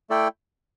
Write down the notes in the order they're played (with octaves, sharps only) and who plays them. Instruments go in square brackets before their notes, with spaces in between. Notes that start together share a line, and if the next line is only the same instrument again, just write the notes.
[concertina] A3 E4 A4 D5 G5